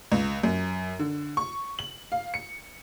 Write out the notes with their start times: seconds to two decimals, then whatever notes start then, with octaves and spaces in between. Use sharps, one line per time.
0.12 C#2
0.43 F#2
0.99 D3
1.37 C#6
1.79 F#7
2.12 F5
2.34 C#7